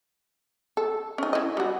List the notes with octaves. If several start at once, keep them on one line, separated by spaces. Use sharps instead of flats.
A4
C#4 D#4
E4 D#5
G3 F#4